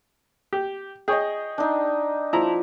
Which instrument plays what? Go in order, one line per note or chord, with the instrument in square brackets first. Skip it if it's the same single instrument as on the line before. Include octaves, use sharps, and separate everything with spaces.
[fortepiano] G4
[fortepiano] G#4 C#5 [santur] D#5 G5
[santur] D4 D#4
[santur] F3 [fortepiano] E4 A#5